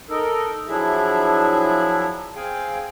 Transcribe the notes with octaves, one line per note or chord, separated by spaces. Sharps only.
D#4 A4 A#4
F3 F#3 D4 E4 G#4 E5
C4 G#4 F5 G5 G#5